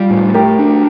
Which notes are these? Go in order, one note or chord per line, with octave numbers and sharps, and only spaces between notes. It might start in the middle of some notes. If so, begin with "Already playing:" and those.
Already playing: G3 F4
A2
A3 G4 A#4
D4